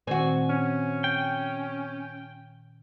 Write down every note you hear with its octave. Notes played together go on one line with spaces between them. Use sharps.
A#2 D#3 C4 F#4 G#5
C#4
G5